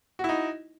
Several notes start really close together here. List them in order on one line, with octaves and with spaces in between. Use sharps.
F#4 E4 D#4